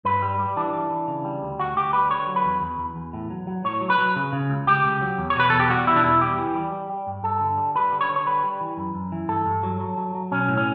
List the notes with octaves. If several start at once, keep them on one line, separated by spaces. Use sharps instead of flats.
G2 B4
G3
G3
E3 D4
E3
E3
C#3
G3
D2
D2 F#4
D2 G4
G3 B4
D3 C#5
F#3
B4
E2
E2
E2
E2
A2
F#3
F#3
A2 C#5
F#3
B4
F#3
C#3
C#3
C#2
C#2 G4
C#2
F#3
E2
C#5
B2 B4
E2 A4
G4
G3 F#4
B2 E4
D4
E2 E4
G3 G4
E3
G3
G3
G3
G2
G2 A4
D3
G3
G3 B4
D3
C#5
D3
C#5
G3 B4
G3
E3
F#2
F#2
E3
G2 A4
G2
F#3
F#3
F#3
F#3
B1 C#4
A2
C#4